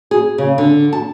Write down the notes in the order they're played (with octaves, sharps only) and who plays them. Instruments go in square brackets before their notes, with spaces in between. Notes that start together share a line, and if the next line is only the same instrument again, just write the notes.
[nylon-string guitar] G#4
C#3
D3
A5